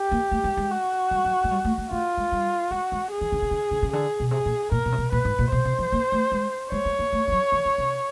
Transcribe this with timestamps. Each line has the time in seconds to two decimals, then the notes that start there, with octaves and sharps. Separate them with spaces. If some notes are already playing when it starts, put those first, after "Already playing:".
Already playing: G4
0.12 A#3
0.31 A3
0.44 G#3
0.57 G#3
0.70 F#4
1.11 G3
1.25 F#3
1.44 G#3
1.51 G3
1.65 A3
1.78 A3
1.91 A3 F4
2.17 G#3
2.32 G3
2.71 G#3 F#4
2.92 G#3
3.11 G#4
3.21 D#3
3.32 D3
3.42 C#3
3.51 D3
3.71 D3
3.82 C#3
3.92 D3 G#4
4.20 B2
4.31 C3 G#4
4.46 A#2
4.72 A#2 A#4
4.86 B2
4.92 C3
4.98 B2
5.12 A#2 B4
5.25 G#2
5.39 A#2
5.52 B2 C5
5.65 C3
5.78 F3
5.92 A#3
6.12 A3
6.32 G#3
6.72 G#3 C#5
6.85 G#3
6.99 A#3
7.13 A3
7.28 G3
7.32 F#3
7.52 E3
7.65 D#3
7.78 C3